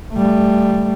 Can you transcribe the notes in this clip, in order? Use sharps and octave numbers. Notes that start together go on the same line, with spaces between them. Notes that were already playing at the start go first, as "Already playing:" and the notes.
G3 A3